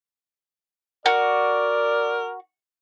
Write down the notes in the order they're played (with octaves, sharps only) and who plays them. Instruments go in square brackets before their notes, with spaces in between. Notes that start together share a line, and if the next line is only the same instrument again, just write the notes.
[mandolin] F#4 [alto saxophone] A#4 [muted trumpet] D5